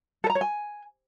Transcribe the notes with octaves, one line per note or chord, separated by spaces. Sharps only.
A4
A#5
C#5
G#5